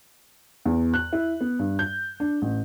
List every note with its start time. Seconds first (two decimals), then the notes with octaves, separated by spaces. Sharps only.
0.66 E2
0.94 F#6
1.13 E4
1.41 B3
1.59 G2
1.79 G6
2.20 D4
2.42 A1